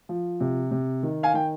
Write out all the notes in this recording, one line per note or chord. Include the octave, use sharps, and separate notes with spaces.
F3
C3
C3
D#3
F5 G#5
D#3 G5